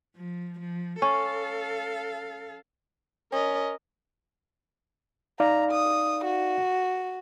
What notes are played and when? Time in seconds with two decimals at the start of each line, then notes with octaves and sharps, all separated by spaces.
0.17 F3
0.60 F3
1.02 C#4 A4 F5
3.32 C#4 A#4 D#5
5.40 D#4 D5 F5 A#5
5.72 D#6
6.25 F#4